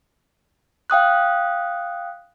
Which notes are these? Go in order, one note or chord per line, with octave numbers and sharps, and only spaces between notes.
F5 G5 D#6 F#6